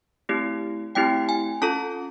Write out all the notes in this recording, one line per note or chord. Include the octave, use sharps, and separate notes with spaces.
A3 C4 E4 G4
A3 C4 E4 G4 G5
G#5
C#4 F4 A4 A5